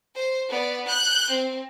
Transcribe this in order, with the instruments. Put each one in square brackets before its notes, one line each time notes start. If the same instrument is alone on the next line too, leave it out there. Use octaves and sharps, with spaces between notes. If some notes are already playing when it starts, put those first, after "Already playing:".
[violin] C5
B3 D5
F#6 G6
C4